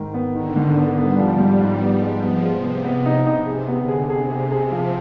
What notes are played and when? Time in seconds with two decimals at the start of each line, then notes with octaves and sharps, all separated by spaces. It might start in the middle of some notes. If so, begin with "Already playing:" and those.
Already playing: G#2 D#3
0.14 B3
0.35 D3 D#3
0.56 G#2
0.77 B3
0.98 G3 B3
1.18 F3
1.39 G#2
1.60 G#2
1.81 B3
2.01 G#3
2.23 F3 B3
2.43 G#3
2.53 C3
2.64 B3
2.85 B3
3.06 D#4
3.27 D#4
3.47 C3 G#4
3.68 B3
3.78 D3
3.89 G#4
4.09 C3 G#4
4.31 G#4
4.52 G#4
4.72 F3